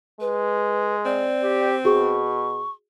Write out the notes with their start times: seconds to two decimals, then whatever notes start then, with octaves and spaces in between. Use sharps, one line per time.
0.21 G#3 B4
1.05 C4 D5
1.42 G4
1.85 B2 F#4 G#4 C#6